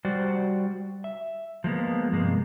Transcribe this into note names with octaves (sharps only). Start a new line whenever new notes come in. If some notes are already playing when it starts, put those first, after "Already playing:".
G3 F#4 C5 D5
E5
F3 G#3 A#3 B3
G2 C3 G#3 A#3